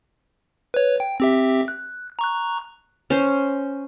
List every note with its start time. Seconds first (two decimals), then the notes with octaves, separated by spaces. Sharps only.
0.74 B4 C#5
1.00 G5
1.20 C4 G4 E5
1.68 F#6
2.19 A#5 C#6 F#6
3.10 C#4 C5